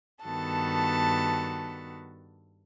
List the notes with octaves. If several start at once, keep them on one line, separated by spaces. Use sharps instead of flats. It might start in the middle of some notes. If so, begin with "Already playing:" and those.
G2 D#3 B3 F#4 A4 A5